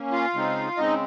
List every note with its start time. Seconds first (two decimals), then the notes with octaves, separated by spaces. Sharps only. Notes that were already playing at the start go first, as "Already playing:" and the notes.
Already playing: A#3 C#4
0.12 F4 F5
0.34 C#3 G#3 C4 D#4
0.77 C#3 G#3 C4 D#4 D#5